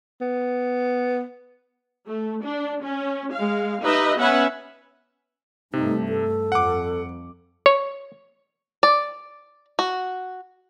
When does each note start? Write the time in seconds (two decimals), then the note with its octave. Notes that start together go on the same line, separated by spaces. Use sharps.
0.21 B3
2.08 A3
2.45 D4
2.84 C#4
3.34 G#3 F5
3.83 D#4 G4 B4 D#5 E5
4.17 B3 C#4 B4 E5 F#5 G#5
5.73 G2 C3 A3 D#4
6.09 A4
6.52 F2 F#5 D6
7.66 C#5
8.83 D5
9.79 F#4